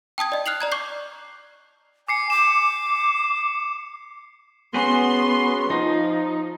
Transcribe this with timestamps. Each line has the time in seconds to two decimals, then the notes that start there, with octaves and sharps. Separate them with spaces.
0.18 G5 A5 D#6 G#6
0.32 D5 D#5
0.46 F6 F#6 C7 F7 F#7
0.60 D5 A#5 G#6
0.72 C#6 D6 G6 C7
2.08 G#5 D6 C7 C#7
2.30 D6 E7
4.74 B3 C#4 F#4 G#4 C6
5.70 F3 D#4